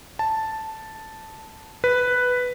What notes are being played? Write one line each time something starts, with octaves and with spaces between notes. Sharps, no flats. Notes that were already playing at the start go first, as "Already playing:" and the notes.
A5
B4